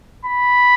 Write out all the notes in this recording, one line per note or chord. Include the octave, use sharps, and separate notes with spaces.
B5